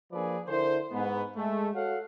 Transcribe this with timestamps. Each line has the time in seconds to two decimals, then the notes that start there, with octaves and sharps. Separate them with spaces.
0.12 F3 A#3 D4 G#4 B4 D5
0.48 D3 E4 A#4 C5
0.91 G#2 B3
1.36 G#3 A3
1.73 F#4 A4 C#5 F5 F#5